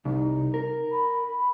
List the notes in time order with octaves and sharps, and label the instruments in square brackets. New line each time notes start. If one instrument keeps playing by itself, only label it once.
[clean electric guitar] C2 [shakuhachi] D#4
[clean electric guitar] A#4
[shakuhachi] B5